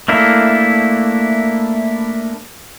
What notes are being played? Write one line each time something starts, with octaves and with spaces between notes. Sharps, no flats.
A3 A#3 D4 E4